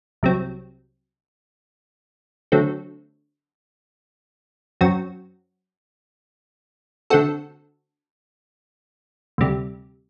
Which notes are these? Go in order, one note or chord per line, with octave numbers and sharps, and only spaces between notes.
C2 C3 F#3 C4
D3 F#3 A3 C4
F#2 F#3 C4 F#4
D3 A3 C4 F#4 A4
D2 C3 G3